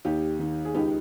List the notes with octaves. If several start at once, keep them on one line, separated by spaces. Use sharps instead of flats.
D#2 D#4 G4
D#3
G#4
C#2 D#4 G4